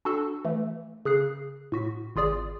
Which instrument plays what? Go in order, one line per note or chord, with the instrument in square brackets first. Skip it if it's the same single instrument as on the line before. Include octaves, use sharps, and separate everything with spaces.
[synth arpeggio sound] D4 F#4 A4 A5
E3 A3
C#3 G#4 F#6 C7
A2 F#4 B6
G#1 F4 G#4 D5 D#6